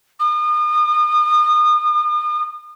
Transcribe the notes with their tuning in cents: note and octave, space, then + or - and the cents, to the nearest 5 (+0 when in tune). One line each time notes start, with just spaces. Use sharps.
D#6 -35